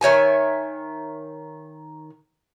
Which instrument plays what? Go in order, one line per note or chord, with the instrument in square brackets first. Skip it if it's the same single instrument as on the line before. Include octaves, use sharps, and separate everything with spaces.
[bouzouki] D#3 C#5 E5 G#5